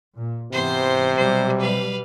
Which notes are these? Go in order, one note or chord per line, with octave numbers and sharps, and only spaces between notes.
A#2
G#2 C3 E3 B3 C5 C6
B2 F#3 G3 C5
B4 F5